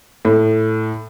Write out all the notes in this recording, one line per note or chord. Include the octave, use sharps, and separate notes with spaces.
A2